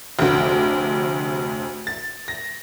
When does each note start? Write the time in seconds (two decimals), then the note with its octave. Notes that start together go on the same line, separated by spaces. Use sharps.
0.19 F1 D2
1.87 A6
2.28 A#6